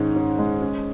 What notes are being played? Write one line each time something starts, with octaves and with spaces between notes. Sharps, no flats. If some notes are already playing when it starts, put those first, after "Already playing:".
Already playing: G#2 D#3 G#3 C#4
C#4
G#3
C#4